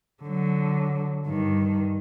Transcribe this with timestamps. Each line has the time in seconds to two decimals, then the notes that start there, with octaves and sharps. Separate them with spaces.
0.23 D3 F#3
1.27 G2 D#3